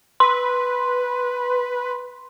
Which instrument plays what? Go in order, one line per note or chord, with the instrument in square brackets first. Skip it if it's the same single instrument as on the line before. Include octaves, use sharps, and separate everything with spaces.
[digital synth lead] B4 [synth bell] C6